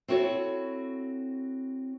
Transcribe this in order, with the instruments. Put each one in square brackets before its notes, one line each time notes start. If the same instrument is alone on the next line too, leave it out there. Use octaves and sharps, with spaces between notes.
[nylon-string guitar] C4 E4 F#4 A4 C#5